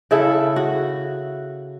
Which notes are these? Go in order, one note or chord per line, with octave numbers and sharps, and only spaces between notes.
C#3 E4 A4
F#4